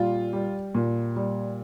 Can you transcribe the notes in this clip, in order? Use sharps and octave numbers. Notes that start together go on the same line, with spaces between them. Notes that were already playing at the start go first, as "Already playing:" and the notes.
Already playing: A#2 G3 F4
G3
A#2
G3